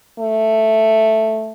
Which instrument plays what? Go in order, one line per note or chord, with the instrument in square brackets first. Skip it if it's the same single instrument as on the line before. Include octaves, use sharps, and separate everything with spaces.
[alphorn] A3